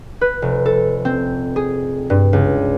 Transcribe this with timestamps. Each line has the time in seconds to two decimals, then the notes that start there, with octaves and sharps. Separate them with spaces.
0.21 B4
0.42 F1
0.66 A4
1.05 C4
1.56 G#4
2.10 G2
2.33 C#2